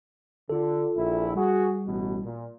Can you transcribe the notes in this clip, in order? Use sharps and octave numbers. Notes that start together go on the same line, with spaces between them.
D3 F4 A4
A#1 E4
G3 F#4 G#4
A1 B2
A#2